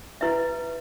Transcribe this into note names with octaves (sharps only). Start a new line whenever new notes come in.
E4 B4 E5